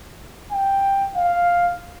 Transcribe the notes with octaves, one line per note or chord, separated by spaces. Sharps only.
G5
F5